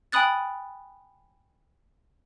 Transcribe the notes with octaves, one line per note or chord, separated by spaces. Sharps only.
G5 G#5 B5 D#6 F#6 A6